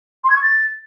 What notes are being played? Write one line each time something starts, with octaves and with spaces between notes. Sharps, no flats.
C6
G#6
C#6
A6